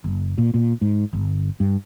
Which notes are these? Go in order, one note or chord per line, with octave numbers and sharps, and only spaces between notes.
F#1
A#2
A#2
G#2
G1
G2